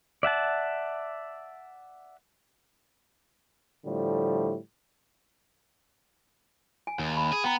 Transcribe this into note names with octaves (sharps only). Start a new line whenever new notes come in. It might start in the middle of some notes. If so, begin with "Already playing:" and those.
D5 E5 F#5 A5
A2 D3 F3 G3 A3
G#5
D#2
B5
G#4
B3 G5 A#5